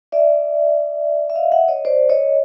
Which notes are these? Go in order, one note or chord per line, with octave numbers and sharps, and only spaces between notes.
D5 E5
E5
D#5 F5
E5 F#5
C#5 D#5
C5 D5
C#5 D#5